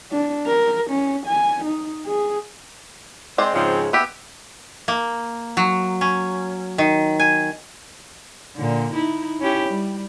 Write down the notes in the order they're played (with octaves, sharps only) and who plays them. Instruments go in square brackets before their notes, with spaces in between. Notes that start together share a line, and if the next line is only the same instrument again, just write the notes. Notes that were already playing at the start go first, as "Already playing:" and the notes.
[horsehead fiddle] D4
A#4
C#4
G#5
D#4
G#4
[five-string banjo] G#3 C5 D5 [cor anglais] C4
[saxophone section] G#2 C#3 F3 [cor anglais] C4
[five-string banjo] B3 G4 [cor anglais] E5
[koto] A#3
F#3
C#4
D#3
G#5
[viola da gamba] A#2 D3
D#4 E4
C#4 E4 G4
G3